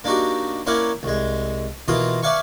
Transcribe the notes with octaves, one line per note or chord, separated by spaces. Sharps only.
A#3 D4 D#4 F#4 G4
A#3 C#4 E4 A#4 D5 F#5
C2 G#3
B2 E3 A#3 F4 D#6
B4 D5 E5 F5 G#5 C#6